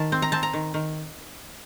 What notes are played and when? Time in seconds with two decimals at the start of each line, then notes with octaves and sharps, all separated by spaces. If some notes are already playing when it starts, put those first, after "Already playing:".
Already playing: D#3 A5
0.12 C4
0.22 A#5
0.32 C4 A5
0.43 A#5
0.53 D#3
0.74 D#3